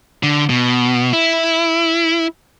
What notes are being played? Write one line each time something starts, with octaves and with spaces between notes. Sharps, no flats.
D3
B2
E4